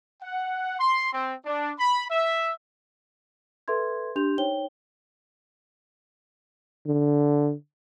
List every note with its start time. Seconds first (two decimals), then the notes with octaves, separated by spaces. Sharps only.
0.22 F#5
0.80 C6
1.13 C4
1.46 D4
1.79 B5
2.11 E5
3.68 A4 B4 E5 C6 G#6
4.16 D4 G4 C6 G6 F7
4.38 D#4 C5 C#5 G5 G7
6.87 D3